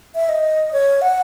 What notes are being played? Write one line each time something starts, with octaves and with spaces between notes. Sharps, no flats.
E5
D#5
C#5
F#5